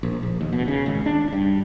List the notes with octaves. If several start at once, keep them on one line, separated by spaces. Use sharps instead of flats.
A#1
A#1
D#2
B2
C#3
G#1
D4
G2